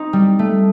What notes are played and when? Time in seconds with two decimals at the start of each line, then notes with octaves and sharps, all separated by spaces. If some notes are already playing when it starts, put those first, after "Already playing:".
Already playing: C4 D#4
0.13 G3
0.39 A3